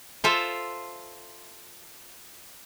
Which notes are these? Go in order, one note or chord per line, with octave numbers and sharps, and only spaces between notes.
F4 A4 C5 E5